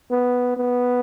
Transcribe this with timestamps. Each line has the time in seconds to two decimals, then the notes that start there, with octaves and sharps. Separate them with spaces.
0.11 B3
0.57 B3